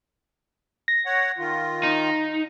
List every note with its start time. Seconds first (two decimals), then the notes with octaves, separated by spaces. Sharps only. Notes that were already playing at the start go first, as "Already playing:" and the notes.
0.88 A#6
1.06 C#5 F#5
1.38 D#3 F4
1.83 D#4